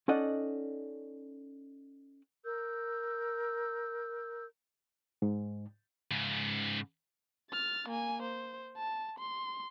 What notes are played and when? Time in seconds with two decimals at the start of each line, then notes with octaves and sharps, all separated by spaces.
0.08 C#4 D#4 A4 D5 D#5 F#5
2.46 A#4 E6 G6
5.22 G#2
6.11 G#2 C#3
7.50 F6 A6
7.88 A#3 G#5
8.22 C5
8.77 A5
9.19 C6